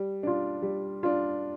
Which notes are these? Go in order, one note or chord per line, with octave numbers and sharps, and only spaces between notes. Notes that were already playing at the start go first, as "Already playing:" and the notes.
Already playing: G3
D4 F4
G3
D4 F4